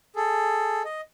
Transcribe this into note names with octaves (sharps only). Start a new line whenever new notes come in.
G#4 A4
D#5